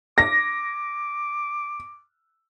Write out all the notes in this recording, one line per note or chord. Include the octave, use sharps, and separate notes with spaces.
D6 A#6